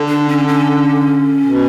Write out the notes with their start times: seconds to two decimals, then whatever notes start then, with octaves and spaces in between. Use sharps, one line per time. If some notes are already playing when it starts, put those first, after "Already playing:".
Already playing: D3
0.09 D4
0.29 C#4
0.48 C#4
1.45 B2